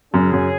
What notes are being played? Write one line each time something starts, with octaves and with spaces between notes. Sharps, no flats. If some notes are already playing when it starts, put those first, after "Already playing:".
F#2 C#3 F#3 C#4 G#4
F#2